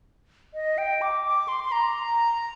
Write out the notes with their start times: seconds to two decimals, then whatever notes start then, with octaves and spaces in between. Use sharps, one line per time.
0.54 D#5
0.78 G5
1.02 D6
1.25 D6
1.48 C6
1.64 C6
1.72 A#5